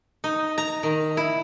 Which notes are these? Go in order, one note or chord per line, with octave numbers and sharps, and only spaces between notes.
D#4
A#5
D#3
E4